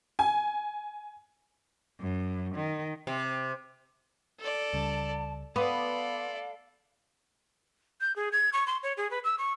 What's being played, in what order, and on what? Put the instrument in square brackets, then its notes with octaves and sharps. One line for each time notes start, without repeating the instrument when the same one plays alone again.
[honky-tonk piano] G#5
[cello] F#2
D#3
[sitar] C3
[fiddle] A4 D5
[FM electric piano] C#2 C#3 G3 [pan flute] A5
[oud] B3 [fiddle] A4 D5 [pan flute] F5 [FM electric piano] C6 D6
[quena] G6
G#4
G#6
C#6
C6
C#5
G#4
B4
E6
C#6